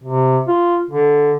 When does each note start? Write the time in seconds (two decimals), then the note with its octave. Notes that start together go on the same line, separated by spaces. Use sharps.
0.04 C3
0.48 F4
0.90 D3